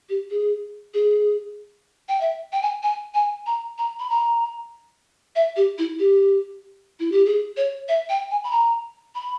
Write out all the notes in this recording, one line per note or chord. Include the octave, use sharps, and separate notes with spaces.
G4
G#4
G#4
G5
E5
G5
G#5
G#5
G#5
A#5
A#5
B5
A#5
E5
G4
E4
G4
E4
G4
G#4
C#5
E5
G5
G#5
B5
A#5
B5